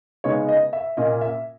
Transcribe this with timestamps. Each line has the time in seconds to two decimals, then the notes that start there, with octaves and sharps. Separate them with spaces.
0.24 C#3 G#3 B3 D#4 C#5
0.49 D#5
0.73 E5
0.97 A#2 A#3 C#4 D#5
1.21 E5